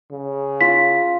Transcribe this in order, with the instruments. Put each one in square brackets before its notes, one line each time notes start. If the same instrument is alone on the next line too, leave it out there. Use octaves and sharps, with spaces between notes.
[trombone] C#3
[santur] F4 [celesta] B6